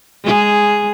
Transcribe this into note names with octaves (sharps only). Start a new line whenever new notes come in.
G#3 G#4